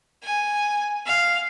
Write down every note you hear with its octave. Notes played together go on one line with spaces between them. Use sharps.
G#5
F5